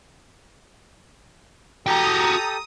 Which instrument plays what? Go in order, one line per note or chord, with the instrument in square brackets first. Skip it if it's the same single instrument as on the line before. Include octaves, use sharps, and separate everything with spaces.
[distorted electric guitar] F#4 G5 [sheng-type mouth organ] G4 A4 [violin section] A#5 [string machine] D#6